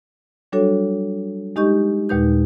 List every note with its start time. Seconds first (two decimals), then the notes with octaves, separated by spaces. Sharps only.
0.52 F#3 G3 D4 F#4 A4 C#5
1.56 G#3 D#4 G4 D#5 C#6 G6
2.09 D#2 A#2 G#3 D#4 B4 G6